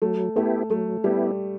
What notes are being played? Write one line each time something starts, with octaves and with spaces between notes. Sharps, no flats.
F#3 A3
A3 B3 E4 G4
F#3 A3
G3 B3 E4 G4